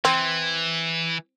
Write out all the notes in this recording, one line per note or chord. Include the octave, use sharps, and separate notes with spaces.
E3 C4